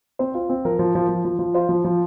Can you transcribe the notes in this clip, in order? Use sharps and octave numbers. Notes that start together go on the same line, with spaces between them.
C4 C5
F4
C4
F3 A#4
F3
F3
F3
F3
F3
F4 C5
F3
F3